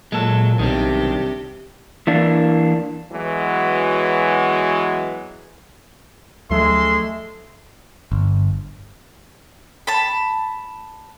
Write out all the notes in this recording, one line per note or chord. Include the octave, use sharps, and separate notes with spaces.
A#2 F#3 G#3 A4
B1 C3 D#3 G3 D4 G4
E3 A#3 D4
E3 F#3 G#3 B3 F#4
D2 F3 F#3 G#3 A3 E5 C6
G1
A5 B5